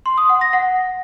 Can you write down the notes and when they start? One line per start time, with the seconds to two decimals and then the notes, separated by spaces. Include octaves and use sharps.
0.06 C6
0.17 D#6
0.29 F#5
0.41 A#6
0.53 F#5